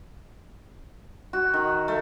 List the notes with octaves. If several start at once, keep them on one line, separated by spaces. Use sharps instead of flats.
F#4
D#3
A3